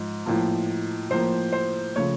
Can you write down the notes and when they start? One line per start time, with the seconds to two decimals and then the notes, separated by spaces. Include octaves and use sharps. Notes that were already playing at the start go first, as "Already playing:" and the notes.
Already playing: G#2 F3
0.26 A2 F3 A#3
1.10 A2 F3 A#3 C5
1.52 C5
1.96 C#3 F3 A3 C#5